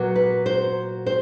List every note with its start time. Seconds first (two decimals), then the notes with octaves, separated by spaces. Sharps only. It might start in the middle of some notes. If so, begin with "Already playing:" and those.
Already playing: A#2 F#3 B3
0.16 B4
0.46 C5
1.06 C5